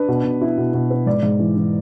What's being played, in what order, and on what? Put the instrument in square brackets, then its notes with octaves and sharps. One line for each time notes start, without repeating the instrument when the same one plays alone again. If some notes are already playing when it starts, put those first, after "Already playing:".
Already playing: [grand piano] D4 B4
B2
B2
E4
B2
B2
B3
G#2 D5
G#2
E3
E3